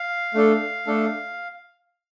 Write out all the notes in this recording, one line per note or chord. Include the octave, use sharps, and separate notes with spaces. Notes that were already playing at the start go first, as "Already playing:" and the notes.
Already playing: F5
A3 D4 A4
A3 D4 A4